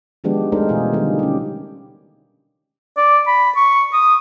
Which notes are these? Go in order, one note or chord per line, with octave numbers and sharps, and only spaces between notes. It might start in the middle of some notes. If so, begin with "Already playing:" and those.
D#3 F3 G#3 B3 D4 G4
G#3 A3 D4 D#4 A#4 C5
B2 E3 D#4 F4 G#4
D3 D#3 G3
C#4 G4
D5
B5
C#6
D#6